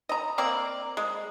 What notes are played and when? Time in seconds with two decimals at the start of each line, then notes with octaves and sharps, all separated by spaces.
0.09 D#5 A#5
0.38 A#3 C4 A#4 D5
0.97 G#3